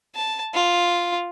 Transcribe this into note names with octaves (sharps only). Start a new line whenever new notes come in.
A5
F4